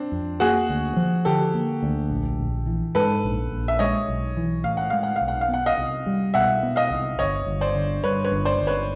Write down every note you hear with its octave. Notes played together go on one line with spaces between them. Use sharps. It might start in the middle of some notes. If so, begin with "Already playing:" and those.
Already playing: C4 D4
F2
A#3 F#4 G#4
D2
F3
D3 G4 A4
A#3
D2
A#1
A#1
E3
G#2 A4 B4
A#1
A#1
E5
G#3 C#5 D#5
B1
E3
A2 F5
F#5
G#3 F5
F#5
F5
B1
F#5
F5
B3 F#5
D#5 F5
C2
G3
B2 E5 F#5
B3
D#5 F5
C2
G1 C#5 D#5
G1
C5 D5
D3
G2 B4 C#5
B4 C#5
G1
C5 D5
G1
B4 C#5